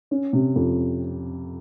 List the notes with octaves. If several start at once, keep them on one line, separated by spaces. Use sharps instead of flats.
C#4
C3
F2